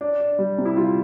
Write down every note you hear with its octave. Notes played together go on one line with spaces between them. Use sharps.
D4
D4
G3
C3
E4
G3 F4